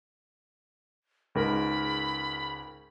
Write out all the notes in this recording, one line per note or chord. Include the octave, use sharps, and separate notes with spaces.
C#2 G#2 A#4 B5